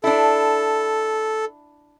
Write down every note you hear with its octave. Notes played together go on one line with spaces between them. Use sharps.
D4 E4 A4